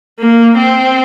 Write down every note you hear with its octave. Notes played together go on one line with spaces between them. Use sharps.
A#3
C4